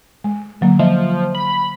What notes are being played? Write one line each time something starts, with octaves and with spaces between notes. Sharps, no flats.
G#3
D3 F#3 A#3
F3 D#5 E5
B5